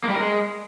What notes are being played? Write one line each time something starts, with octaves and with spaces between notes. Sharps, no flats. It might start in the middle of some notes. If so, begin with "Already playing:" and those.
A#3
G3
A#4
G#3